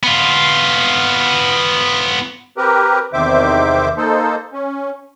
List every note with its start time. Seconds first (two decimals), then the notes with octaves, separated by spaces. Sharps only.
0.03 B3 F4
2.57 C4 G4 A#4 B4
3.13 E2 C3 D#3 C5 E5 D6
3.97 A#3 D#4 A4 C5
4.53 C#4